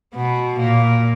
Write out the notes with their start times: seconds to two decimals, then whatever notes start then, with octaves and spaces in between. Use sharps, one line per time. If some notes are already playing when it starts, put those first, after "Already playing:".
0.15 B2 B3
0.59 A#2 A#3